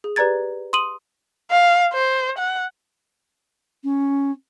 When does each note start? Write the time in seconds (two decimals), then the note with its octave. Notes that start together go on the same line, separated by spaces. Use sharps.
0.04 G#4
0.16 G4 B4 D5 A#5 G#6 A6
0.73 C6 D#6 D#7 F#7
1.51 F5
1.94 C5
2.38 F#5
3.83 C#4